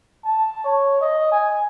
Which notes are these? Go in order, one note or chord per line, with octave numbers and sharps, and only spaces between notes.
A5
C#5
D#5
G#5